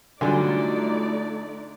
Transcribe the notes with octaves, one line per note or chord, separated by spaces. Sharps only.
D3 F#3 G3 A3 D#4 F4 D5 G#5